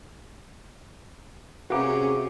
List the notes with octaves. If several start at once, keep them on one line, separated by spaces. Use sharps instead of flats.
C3 E3 A#3 C#4 F#4 G#4 D6